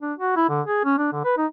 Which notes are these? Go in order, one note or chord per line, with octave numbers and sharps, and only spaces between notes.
D4
F#4
E4
D3
G#4
C#4
D4
D3
B4
D#4